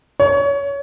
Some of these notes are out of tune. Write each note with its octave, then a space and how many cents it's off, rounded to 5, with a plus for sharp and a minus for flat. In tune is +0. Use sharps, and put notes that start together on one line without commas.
C#5 +25